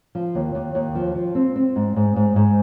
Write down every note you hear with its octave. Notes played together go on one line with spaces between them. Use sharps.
F3
D#2
D#2
D#2
F3
F3
C4
C4
G#2
G#2
G#2
G#2